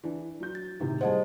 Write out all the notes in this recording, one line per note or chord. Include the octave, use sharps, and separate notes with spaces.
E3 D4
F#3 G6
A6
A2 C3 D#3
G3 G#4 C5 D#5 F#5 A5